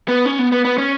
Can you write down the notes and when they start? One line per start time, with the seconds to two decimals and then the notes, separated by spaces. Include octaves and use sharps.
0.08 B3
0.26 C#4
0.39 B3
0.52 B3
0.65 B3
0.78 C#4